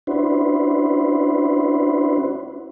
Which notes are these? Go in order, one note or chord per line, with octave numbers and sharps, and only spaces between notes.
C#4 D4 E4 F#4 B4 C5